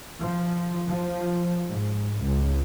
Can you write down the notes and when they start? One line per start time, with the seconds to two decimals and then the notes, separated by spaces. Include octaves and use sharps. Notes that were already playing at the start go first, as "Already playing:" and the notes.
0.20 F3
0.88 F3
1.71 G#2
2.23 C#2